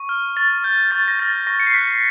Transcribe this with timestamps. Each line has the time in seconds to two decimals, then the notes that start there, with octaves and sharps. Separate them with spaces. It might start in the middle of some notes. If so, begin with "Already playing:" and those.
Already playing: C#6
0.09 F6
0.36 C#6 A6
0.64 F6 G6
0.91 C#6 A6
1.08 A#6
1.19 F6 A6
1.47 C#6 A#6
1.60 C#7
1.67 C7
1.74 F#6 B6